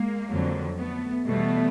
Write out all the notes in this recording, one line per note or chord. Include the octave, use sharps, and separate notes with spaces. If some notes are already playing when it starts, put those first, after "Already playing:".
Already playing: G#3 A#3
F2 D3 F#3
A3 B3
E2 B2 G3 A3 B3